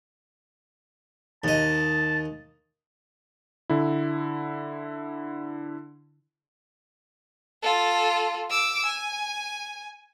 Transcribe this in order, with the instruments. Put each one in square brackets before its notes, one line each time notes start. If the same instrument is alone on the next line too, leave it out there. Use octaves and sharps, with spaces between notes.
[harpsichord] D#2 D#5 [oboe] A5
[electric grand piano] D3 E4
[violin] F4 A4
D6 E6
G#5